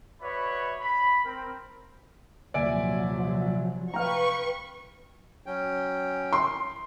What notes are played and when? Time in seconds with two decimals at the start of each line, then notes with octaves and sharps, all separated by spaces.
0.21 F#4 B4 C#5 D5 E5 B5
0.80 B5
1.24 C4 A#4
2.54 D#1 C3 F3 F#3 D5 E5 G#5 D7
3.94 B4 F5 G5 A#5 C#6 F6
5.46 F#3 C#4 G5
6.33 C6